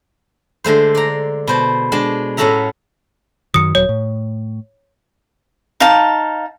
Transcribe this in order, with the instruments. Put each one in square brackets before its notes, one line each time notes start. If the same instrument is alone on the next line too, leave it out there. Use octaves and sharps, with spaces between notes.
[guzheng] D3 G#3 A3 C5
D5 A#5
B2 C5 A5
G#3 D4 A5
A2 C#4 F#4 A4 E5 A#5
[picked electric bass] F#2 D#3 F#3 [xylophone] D#6 C#7
[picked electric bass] D#1 F#3 [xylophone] C#5
[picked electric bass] A2
[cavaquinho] D#4 F5 A5